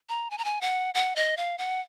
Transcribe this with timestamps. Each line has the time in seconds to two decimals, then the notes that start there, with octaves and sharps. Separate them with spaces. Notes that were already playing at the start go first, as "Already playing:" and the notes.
0.09 A#5
0.31 G#5
0.38 A#5
0.45 G#5
0.61 F#5
0.94 F#5
1.16 D#5
1.37 F5
1.58 F#5